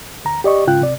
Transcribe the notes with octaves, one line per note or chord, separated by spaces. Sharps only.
D2 A#5
G4 D5 D#5 C#6
G#2 C#3 F4 G5 F#6
C3 D5